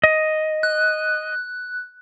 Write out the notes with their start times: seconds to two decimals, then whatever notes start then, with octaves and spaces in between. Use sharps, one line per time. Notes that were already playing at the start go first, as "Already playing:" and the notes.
0.04 D#5
0.63 F#6